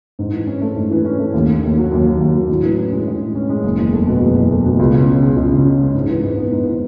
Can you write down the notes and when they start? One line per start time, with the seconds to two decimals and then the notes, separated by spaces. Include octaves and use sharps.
0.19 G#2
0.33 E3
0.47 C#4
0.61 A3
0.76 G#2
0.91 E3
1.05 C#4
1.19 A3
1.34 D#2
1.48 D#3
1.63 D#2
1.78 F#3
1.92 D#2
2.06 D#3
2.21 D#2
2.34 F#3
2.49 A2
2.63 E3
2.77 C#4
2.92 G#3
3.07 A2
3.21 E3
3.35 C#4
3.49 G#3
3.64 F#1
3.78 E2
3.93 A3
4.07 B2
4.22 F#1
4.36 E2
4.50 A3
4.65 B2
4.79 C#2
4.93 C#3
5.08 C#4
5.23 G#3
5.36 C#2
5.51 C#3
5.66 C#4
5.80 G#3
5.95 G#2
6.09 E3
6.23 G#2
6.37 B3
6.52 G#2
6.66 E3